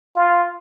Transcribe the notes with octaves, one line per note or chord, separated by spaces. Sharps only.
F4